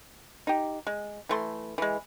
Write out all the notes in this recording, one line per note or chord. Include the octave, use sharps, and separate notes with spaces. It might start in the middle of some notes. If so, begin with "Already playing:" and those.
D#4 G4
G#3
E3 A3 C6
E3 G#3